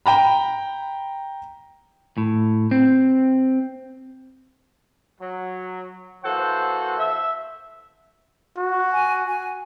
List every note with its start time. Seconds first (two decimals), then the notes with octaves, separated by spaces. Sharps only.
0.06 G5 A#5 B5
2.18 A2
2.71 C4
5.21 F#3
6.24 E3 A#3 F#4 A4 C5 F#5
6.98 E5
8.57 F#4
8.93 G#5
9.26 G#5